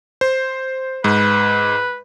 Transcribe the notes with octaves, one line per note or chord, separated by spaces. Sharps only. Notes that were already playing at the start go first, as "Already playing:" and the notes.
C5
G#2 B4